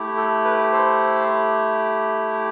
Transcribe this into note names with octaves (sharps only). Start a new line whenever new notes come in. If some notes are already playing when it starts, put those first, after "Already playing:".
Already playing: A3 E4 G4
A4
B4
A4 C5